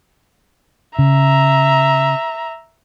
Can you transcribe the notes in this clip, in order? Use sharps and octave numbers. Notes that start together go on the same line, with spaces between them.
C#3 E5 A#5